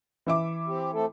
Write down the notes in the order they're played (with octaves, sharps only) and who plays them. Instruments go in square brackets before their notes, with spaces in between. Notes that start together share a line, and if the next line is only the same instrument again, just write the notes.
[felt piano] E3 E5 D6
[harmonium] C4 G4
A3 C4 A4